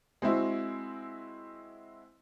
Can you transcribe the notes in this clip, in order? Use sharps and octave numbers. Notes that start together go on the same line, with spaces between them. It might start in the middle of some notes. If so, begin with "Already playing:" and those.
G#3 C4 E4 F#4